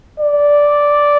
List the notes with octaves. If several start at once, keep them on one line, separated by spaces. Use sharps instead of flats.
D5